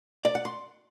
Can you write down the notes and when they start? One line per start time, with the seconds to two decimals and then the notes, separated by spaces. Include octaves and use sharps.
0.25 D5
0.35 F#5
0.45 C6